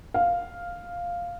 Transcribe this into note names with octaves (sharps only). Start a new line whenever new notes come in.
F5